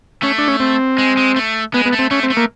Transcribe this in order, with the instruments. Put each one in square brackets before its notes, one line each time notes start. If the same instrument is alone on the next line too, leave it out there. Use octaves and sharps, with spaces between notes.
[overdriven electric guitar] A3 [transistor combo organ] C#4
[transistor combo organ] D4
C#4
C4
[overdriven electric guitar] G#3
G#3
A3
[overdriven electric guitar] G#3 [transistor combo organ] B3
[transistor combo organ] B3
[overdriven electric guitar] A3
[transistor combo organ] C4
[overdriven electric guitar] A3 [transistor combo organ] C#4
[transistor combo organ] C4
[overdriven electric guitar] A3
[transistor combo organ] A#3